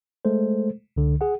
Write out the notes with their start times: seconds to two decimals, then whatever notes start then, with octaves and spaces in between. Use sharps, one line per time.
0.25 G#3 A3 A4 C5
0.97 C#2 D3
1.21 G#4 F#5